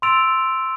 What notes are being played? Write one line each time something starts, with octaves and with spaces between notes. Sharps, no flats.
C6 E6 A6 D7 F7